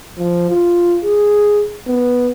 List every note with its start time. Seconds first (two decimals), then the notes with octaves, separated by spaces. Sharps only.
0.18 F3
0.50 F4
1.04 G#4
1.87 B3